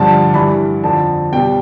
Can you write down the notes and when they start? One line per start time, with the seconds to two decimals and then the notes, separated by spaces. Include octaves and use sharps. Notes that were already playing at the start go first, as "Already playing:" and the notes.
Already playing: G2 D3 F3 A5
0.34 G2 E3 G3 B5
0.84 F2 D3 F3 A5
1.32 B2 G3 G5